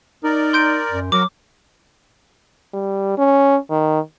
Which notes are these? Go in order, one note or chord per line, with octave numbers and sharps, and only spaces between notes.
D#4 A#4 D5
C6 G6 D7
F#2
F#3 F#4 A#4 D6
G3
C#4
D#3